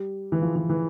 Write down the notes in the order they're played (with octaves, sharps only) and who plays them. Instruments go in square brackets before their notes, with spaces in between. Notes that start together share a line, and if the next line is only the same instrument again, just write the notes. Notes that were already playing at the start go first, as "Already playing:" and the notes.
Already playing: [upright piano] G3
E3
F3
E3
E3